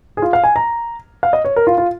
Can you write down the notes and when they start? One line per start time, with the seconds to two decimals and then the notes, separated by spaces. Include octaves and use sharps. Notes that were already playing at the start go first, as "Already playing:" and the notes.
0.17 G#4
0.22 F4
0.33 F5
0.44 G#5
0.56 A#5
1.23 F5
1.33 D#5
1.45 C#5
1.56 A#4
1.67 F4
1.78 F4